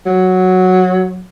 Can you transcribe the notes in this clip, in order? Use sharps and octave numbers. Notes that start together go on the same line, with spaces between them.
F#3